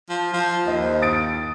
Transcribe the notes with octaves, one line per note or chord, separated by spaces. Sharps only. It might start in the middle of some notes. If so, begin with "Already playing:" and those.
F3
F3
D#2 C5 D#5
D#6 A6 D7